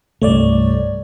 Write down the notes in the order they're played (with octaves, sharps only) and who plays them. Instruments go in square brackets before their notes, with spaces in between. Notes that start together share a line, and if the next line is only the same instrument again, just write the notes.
[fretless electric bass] C2 G2 [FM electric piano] A3 C#5 D5